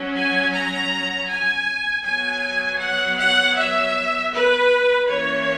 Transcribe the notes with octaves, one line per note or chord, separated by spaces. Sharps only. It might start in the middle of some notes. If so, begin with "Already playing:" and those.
Already playing: F#3 C#4
G#5
A#5
G#5
F#3 B3 G#5
F#5
F#5
E5
B4
E3 A#3 C#4 C#5